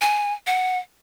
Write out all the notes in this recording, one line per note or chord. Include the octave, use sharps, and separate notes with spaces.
G#5
F#5